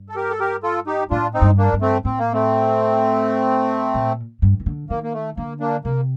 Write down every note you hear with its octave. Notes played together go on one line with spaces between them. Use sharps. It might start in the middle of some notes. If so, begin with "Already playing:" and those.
Already playing: G2
A4
G4 A#4
A4
G4 A#4
F4 A4
D#4 G4
A2 D4 F4
C4 D#4
G2
A#3 D4
G2
A3 C4
A2 C4
A#3
A3 C4
A#2
G2
D#3
D3
D#3 A#3
A#3
A3
D3 A#3
A#3 D4
C3 A#3